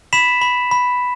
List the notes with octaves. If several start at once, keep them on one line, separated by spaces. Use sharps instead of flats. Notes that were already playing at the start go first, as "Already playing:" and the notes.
B5 B6 E7
B5
B5